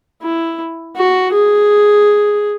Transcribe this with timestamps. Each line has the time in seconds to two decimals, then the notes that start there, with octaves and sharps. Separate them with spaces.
0.22 E4
0.96 F#4
1.33 G#4